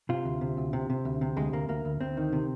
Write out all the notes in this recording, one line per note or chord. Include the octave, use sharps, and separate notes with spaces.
C3 F4
D2
C3
D2
C3
C3
D2
C3
D2 G#3
D2 A#3
D2 A#3
D2
D2 C4
D#3
C3